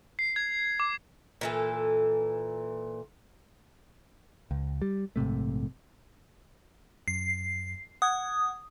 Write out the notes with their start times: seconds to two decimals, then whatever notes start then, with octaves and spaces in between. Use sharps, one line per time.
0.19 C7
0.36 G#6
0.80 D6
1.41 A#2 E3 A4
4.51 C#2
4.82 G3
5.16 A#1 G#2 C3 A3
7.08 F#2 C7
8.02 F#5 D#6 G#6